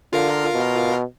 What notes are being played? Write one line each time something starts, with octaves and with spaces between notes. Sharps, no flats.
D3 F4 A#4 F5
B2